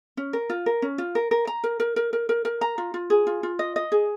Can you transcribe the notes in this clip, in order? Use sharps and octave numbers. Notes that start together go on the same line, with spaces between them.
C#4
A#4
F4
A#4
C#4
F4
A#4
A#4
A#5
A#4
A#4
A#4
A#4
A#4
A#4
A#5
F4
F4
G#4
F4
F4
D#5
D#5
G#4